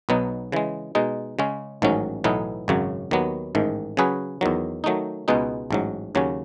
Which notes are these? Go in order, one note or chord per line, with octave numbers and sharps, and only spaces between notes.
B1 B2 F#3 B3 D#4
C#3 E3 G#3
B2 G#3 D#4
C#3 G#3 C#4
A1 G#2 D#3 F#3 C#4
B1 A2 E3 B3 D#4
G#1 F#2 C#3 F#3
D#2 D#3 F#3 B3
A1 G#2 D#3
C#3 F#3 C#4 G#4 B4
E2 D#3 F#3
D#3 F#3 A3 D#4
C#2 B2 G#3 B3 D#4
A1 G#2 F#3
D#2 C#3 F#3 C#4